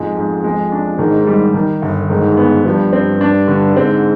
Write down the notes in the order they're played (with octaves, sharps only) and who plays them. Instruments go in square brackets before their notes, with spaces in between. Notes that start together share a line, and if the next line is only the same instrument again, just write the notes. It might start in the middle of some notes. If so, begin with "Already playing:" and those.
Already playing: [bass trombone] F2 [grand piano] G#2 G#3
[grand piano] G#2
G#3
D4
[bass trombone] G#2 [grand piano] D#3
[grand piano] G3
D#3
G1
[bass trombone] G#2 [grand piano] D#3
[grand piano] B3
[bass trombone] G2 [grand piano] F3
[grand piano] C4
D4
D3
[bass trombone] G#2 [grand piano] C4